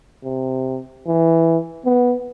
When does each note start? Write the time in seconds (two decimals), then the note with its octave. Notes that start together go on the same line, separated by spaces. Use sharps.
0.24 C3
1.07 E3
1.86 B3